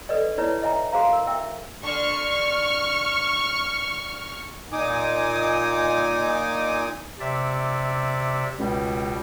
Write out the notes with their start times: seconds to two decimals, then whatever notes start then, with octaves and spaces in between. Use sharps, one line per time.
0.09 A4 B4 D5 D#5
0.38 D#4 E4 B4 C#5 D5
0.62 D#5 E5 G#5 A#5
0.93 F#4 G#4 C5 F5 A#5
1.13 A#4
1.27 A#4 E5 G5
1.83 D3 C#6 F6
4.72 A#2 D#4 G#5 D6 D#6
7.20 C3 D5 E5
8.59 C#2 B2 G3